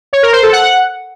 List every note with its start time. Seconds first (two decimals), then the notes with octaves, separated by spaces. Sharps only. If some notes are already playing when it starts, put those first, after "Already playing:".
0.13 C#5
0.23 A#4
0.33 C5
0.43 A4
0.53 F#5